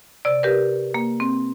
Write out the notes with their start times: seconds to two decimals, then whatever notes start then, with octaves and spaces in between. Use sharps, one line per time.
0.25 C3 D5
0.43 G4 A#4 B4
0.94 A#3
1.20 C4